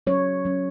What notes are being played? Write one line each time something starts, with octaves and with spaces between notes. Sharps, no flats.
F#3 C#4 C#5
F#3 C#4